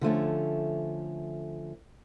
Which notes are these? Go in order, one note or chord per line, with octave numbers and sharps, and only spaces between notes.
D3 F3 A3 C#4